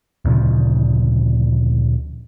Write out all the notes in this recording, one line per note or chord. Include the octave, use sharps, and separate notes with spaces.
D2 A#2 C#3 F3